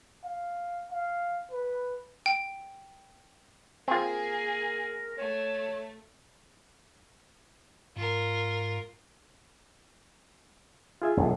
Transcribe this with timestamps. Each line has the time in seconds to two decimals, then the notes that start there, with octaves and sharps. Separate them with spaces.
0.24 F5
0.92 F5
1.51 B4
2.26 G5
3.88 A#3 C4 F4 G#4 A#4
5.18 A3 C#5
7.96 G#2 F4 A#4
11.02 F4 G#4 E5
11.17 E1 B1 A2